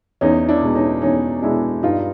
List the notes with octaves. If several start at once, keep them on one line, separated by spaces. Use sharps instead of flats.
E2 C#4 D#4
D4 E4
B2 G#3
C#4 D#4
E2 C#4 D#4
B2 G#3 D4 E4
G2 D#4 F4